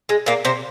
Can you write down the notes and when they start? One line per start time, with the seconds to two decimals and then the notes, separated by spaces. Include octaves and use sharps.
0.09 G#3
0.26 A#2 A#3
0.45 C3 C4